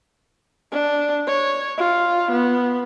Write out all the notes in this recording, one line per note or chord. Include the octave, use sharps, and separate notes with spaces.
D4
C#5
F4
B3